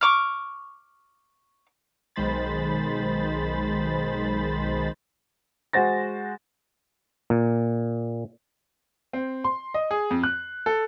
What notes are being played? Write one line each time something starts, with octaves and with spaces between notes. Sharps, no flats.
C#6 D6 F6
B1 D#3 G#3 C5 B5 A6
G#3 F#4 C5 A6 A#6
A#2
C4
C6
D#5
G#4
F2
F#6
A4